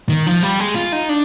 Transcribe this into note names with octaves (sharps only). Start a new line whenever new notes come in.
D#3
F3
G3
G#3
F4
D#4
D4